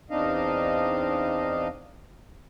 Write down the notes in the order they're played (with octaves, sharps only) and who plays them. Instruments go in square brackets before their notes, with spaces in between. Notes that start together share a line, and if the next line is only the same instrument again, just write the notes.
[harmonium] E2 C4 D4 D#4 D#5 F5